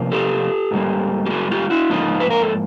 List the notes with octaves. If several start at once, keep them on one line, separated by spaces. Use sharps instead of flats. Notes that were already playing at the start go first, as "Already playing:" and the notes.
Already playing: C3 F3 A#3
G4 A4
G#2 D#3 G3 A#3
G4
F#4 G#4
F4 G4
E4 F#4
G#2 F3 A#3 D#4 F4
B4
A#4
A4